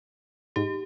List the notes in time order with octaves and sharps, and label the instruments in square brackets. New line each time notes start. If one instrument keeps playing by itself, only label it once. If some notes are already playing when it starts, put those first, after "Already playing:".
[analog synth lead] G#2 [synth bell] G4